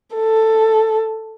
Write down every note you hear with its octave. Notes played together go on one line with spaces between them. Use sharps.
A4